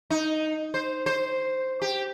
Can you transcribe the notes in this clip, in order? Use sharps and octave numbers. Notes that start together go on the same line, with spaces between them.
D#4
C5
C5
G4